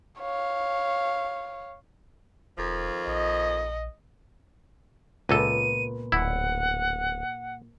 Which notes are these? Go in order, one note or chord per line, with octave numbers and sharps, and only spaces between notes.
C#5 F5
E1 F2 D#3 F3
A#1 D#5
C#2 A#2 B3 A4 D#7
D1 E4 F#5